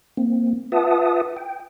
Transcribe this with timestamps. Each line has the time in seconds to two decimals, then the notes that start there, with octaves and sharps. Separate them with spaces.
0.17 A#3 C4
0.72 F4 B4 E5 F#5 A5 D#6
1.37 G5